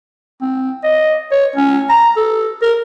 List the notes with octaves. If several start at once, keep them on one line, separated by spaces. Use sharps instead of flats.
C4
D#5
C#5
C#4
A#5
A4
A#4